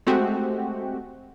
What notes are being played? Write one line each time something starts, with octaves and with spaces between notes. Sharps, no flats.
G#3 A3 C4 F#4 G4